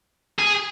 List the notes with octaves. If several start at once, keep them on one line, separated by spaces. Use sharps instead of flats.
G#4